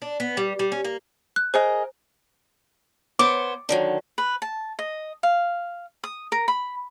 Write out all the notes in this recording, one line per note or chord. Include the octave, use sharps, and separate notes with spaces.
D4
B3
G3
G3
C#4
A#3
F#6
G#4 A#4 C5 D#5
B3 C5 C#5 D6
D3 D#3 F#3
B4
A5
D#5
F5
D#6
A#4
B5